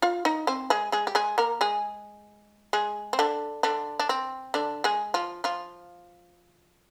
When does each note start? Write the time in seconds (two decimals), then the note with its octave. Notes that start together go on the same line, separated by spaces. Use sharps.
0.02 F4 F5
0.25 D#4 D#5
0.47 C4 C5
0.70 G#3 G#4
0.92 G#3 G#4
1.07 G4
1.15 G#3 G#4
1.38 A#3 A#4
1.61 G#3 G#4
2.73 G#3 G#4
3.13 C4
3.19 D3 D4
3.63 D3 D4
4.00 D4
4.09 C4
4.54 D3 D4
4.84 G#3 G#4
5.14 F3 F4
5.44 F3 F4